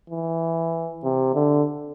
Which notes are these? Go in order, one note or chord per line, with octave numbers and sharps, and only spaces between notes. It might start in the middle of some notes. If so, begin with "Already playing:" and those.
E3
C3
D3